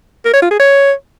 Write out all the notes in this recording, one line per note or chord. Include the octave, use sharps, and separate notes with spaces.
A#4
C#5
F4
G#4
C#5